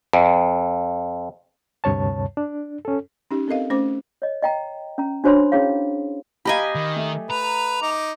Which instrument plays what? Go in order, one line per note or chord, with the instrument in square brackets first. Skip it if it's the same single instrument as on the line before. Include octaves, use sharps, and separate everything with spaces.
[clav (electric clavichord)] F2
[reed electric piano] D2 G2 C3 C#5 A5
D4
C#4 A4
[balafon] C#4 D#4 G4
C4 A4 A#4 D#5 F5
A3 C#4 C5 D6
[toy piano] C#5 D#5
D#5 G5 A#5
C#4 A#5
D4 F#4 C5 C#5 B5 C6
C#4 E4 G#4 C#5 F5
[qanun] G4 D#5 G#5 [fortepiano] F5 A#5 B5
[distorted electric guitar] D#3
[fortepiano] A3
[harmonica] B4 [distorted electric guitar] A#5
[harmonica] D#4 D6